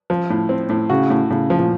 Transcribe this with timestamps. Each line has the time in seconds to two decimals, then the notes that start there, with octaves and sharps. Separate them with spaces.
0.10 F3
0.30 A2
0.49 C4
0.69 A2
0.90 C#3 F#4
1.10 A2
1.30 A2 C#3
1.50 F3
1.58 A#2